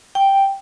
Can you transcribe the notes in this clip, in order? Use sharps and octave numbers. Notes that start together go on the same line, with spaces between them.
G5